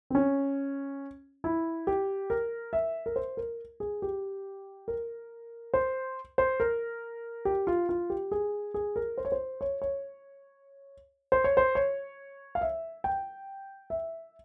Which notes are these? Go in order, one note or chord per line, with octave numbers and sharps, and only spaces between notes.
C4
C#4
E4
G4
A#4
E5
A#4
C5
A#4
G#4
G4
A#4
C5
C5
A#4
G4
F4
F4
G4
G#4
G#4
A#4
C5
C#5
C5
C#5
C#5
C5
C#5
C5
C#5
F5
E5
G5
E5